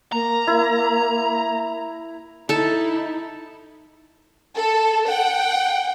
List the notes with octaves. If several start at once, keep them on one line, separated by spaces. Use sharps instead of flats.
A#3 A#5
E4
D#4 E4 A4 A5
A4
F#5 G5